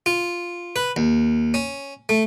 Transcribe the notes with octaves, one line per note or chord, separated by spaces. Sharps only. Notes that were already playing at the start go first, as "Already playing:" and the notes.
F4
B4
D#2
C#4
A3